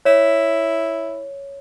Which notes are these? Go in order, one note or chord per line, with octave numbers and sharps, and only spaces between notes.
E4 C#5